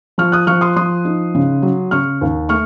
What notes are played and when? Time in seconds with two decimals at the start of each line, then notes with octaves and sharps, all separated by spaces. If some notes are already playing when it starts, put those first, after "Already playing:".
0.18 F3 C#6 F6
0.32 D#6 F#6
0.47 F3 C#6 F6
0.61 C6 D#6
0.76 F3 C6 D#6
1.05 D#4
1.35 C#3
1.62 F#3
1.91 C#3 C#6 F6
2.21 D#2
2.49 A3 C#6 F6